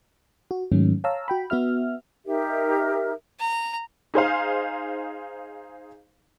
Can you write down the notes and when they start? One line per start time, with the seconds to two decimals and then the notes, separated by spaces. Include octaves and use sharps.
0.51 F#4
0.72 G#2 D#3 F#3 A3 C#4
1.04 C#5 F5 A5 A#5 E6
1.28 F#4 G5 B5
1.50 B3 F#4 E5 F6
2.26 D#4 G4 A#4 E5
3.40 A#5
4.14 D#4 G#4 C5 F5